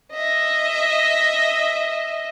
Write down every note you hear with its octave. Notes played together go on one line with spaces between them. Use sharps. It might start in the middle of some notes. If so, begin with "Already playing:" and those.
D#5 E5